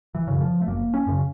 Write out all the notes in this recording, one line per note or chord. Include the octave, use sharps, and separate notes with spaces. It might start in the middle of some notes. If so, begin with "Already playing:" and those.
E3
F#2 C#3
F3
A3
F#1 A#3
C#4
F#2 C#3